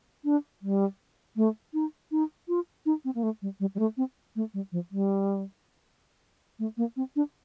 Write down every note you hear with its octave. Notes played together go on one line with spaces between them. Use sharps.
D4
G3
A3
D#4
D#4
F4
D#4
C4
A#3
A3
G3
G3
G3
A3
C4
A3
G3
F3
G3
A3
A#3
C4
D4